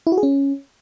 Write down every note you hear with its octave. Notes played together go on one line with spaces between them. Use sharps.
E4
F#4
G#4
C#4